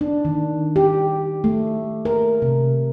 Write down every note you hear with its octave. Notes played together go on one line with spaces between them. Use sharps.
D4
D#3
G4
A3
A#4
C3